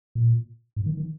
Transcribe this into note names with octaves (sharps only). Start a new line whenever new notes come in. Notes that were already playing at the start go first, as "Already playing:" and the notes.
A#2
G#2
D#3
D#3